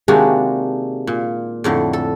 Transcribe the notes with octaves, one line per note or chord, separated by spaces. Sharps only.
C3 D#3 G#3 A#3 D4 F#4
A#2
F2 A2 D3
A4